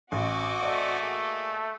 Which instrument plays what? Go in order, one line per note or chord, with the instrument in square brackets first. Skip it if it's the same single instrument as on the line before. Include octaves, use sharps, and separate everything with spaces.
[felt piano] A1 [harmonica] C4 G#5 C#6 [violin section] F#4 D#5 D6
[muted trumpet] A3 [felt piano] D5
[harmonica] A#3 G#4